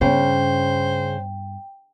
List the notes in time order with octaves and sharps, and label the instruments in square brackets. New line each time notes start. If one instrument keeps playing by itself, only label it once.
[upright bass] G2 B3 [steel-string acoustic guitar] C#3 [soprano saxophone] C5 [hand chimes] G5